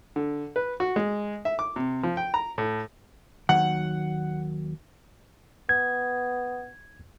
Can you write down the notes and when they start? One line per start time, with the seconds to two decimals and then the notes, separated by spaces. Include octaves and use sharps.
0.16 D3
0.56 B4
0.80 F#4
0.96 G#3
1.45 E5
1.59 D6
1.76 C3
2.03 F3
2.17 G5
2.34 A#5
2.58 A2
3.49 D#2 D#3 F#3 F#5
5.69 B3 G#6